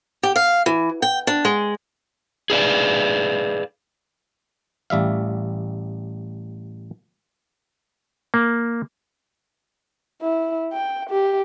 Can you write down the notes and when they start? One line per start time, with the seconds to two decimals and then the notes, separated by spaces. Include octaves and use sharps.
0.23 G4
0.36 F5
0.66 E3
1.02 G5
1.27 D4
1.45 G#3
2.50 G#4 B4 D5 F5
4.90 A1 G3 E5 F5
8.34 A#3
10.22 E4
10.73 G5
11.10 G4